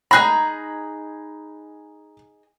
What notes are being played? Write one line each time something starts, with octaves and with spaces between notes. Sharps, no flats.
D#4 G#4 A#5 B5 F#6